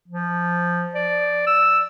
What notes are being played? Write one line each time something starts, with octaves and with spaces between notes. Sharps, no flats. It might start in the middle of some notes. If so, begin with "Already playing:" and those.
F3
D5
E6